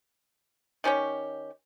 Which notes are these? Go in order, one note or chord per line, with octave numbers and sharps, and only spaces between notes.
D#3 C#4 G4 C#5